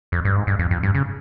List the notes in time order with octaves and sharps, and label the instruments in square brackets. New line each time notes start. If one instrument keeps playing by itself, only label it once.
[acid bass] F2
G2
G#2
G2
F2
F2
G2
C#3